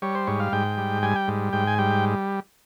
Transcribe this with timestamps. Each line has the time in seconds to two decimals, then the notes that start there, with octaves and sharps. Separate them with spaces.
0.02 G3 C#5
0.15 C5
0.27 G#2 C#5
0.40 F5
0.52 G#2 G5
0.78 G3
1.03 G3 G#5
1.16 G5
1.28 G#2
1.53 G#2 G5
1.67 G#5
1.78 G3 G5